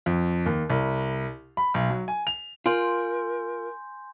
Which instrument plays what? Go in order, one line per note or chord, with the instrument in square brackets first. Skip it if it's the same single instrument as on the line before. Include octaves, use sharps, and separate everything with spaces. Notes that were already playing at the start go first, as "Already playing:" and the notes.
[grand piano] F2
D#2
C2
B5
B1
F#3
G#5
F7
[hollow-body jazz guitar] F4 [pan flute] A#4 [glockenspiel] G#5 C6 G6